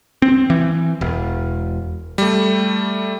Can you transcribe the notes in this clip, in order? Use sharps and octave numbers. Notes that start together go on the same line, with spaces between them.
C4
E3
E1
G3 A3